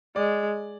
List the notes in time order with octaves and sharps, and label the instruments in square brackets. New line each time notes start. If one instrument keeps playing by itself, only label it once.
[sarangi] G#3 [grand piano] D5